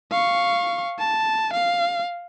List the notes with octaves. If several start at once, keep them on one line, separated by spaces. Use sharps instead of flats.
F5 C#6
A5
F5